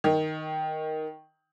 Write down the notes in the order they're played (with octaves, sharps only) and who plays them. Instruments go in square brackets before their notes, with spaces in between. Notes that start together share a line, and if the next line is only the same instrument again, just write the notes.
[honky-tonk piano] D#3